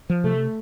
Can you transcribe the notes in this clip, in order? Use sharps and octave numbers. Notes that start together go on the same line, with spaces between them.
F3
C3 A3